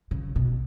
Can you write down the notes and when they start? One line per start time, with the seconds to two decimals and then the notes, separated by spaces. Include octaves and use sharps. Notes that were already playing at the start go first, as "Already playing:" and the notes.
0.11 C#3
0.36 B2